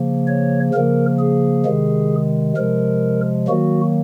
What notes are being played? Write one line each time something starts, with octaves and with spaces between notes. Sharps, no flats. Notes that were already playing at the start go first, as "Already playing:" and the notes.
Already playing: C#3 F3 A#3
C#5
C#3 F3 A#3 A#4
G#4
C3 D#3 G#3
C3 F3 G#3 A#4
D#3 F#3 A#3 F#4